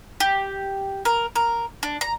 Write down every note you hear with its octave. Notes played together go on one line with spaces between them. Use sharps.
G4
A#4
A#4
D4
A#5